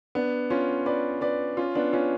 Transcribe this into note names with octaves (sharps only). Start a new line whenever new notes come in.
B3 D4
C#4 F4
B4 D5
B4 D5
C#4 F4
B3 D4
C#4 F4